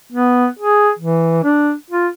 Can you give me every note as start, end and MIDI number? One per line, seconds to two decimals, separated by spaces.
0.12 0.48 59
0.59 0.90 68
0.99 1.42 52
1.43 1.73 62
1.90 2.07 65